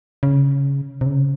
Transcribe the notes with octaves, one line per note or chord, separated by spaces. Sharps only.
C#3
C3
C#3